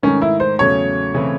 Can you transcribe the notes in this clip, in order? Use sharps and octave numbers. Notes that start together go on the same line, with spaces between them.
G#2 D#3 A3 C#4
E4
C5
E2 C#3 F#3 A3 C#4 C#5
C#3 E3 A3 C4 E4